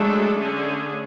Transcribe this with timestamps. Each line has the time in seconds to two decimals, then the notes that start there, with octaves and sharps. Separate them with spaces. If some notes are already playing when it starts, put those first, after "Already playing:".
Already playing: F#3 G#3 A3 D4 A4
0.39 D3 A3 C#4 G#4